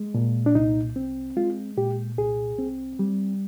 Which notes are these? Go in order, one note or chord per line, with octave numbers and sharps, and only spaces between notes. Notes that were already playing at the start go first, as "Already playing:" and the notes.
Already playing: G#3
A#2
D4
C2 D#4
C4
G#3 F4
A#2 G4
C2 G#4
C4
G3